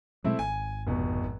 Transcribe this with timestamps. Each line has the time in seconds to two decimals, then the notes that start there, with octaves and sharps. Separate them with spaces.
0.24 B2 F#3 G#3 A3 C4 E4
0.39 G#1 G#5
0.87 F1 B2